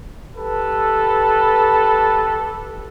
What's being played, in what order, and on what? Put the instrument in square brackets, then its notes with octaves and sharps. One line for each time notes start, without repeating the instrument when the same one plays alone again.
[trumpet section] G4 A4 B4